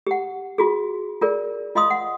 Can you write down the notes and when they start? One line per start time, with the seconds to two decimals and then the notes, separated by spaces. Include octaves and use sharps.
0.07 G4 F#5
0.58 F4 F#4 G#4
1.21 F4 G#4 A#4 D5
1.75 F4 D#5 F5 C6 D#6
1.90 F#5